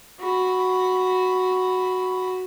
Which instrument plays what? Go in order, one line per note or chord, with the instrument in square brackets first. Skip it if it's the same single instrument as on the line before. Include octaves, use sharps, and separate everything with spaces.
[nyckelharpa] F#4 B5